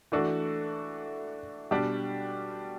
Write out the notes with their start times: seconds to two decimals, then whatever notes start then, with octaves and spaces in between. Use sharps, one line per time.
0.12 E3 A3 D4 F#4 A4
1.71 B2 G3 D4 G4